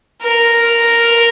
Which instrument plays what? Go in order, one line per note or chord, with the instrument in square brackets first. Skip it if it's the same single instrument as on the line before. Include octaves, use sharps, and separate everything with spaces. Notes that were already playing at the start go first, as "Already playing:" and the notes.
[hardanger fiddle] A#4